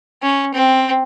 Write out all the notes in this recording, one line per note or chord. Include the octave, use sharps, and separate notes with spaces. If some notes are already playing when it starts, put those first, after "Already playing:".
C#4
C4